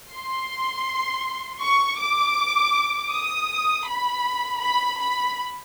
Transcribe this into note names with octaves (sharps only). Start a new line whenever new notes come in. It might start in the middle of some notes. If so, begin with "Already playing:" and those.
C6
C#6
D6
D#6
B5
B5
B5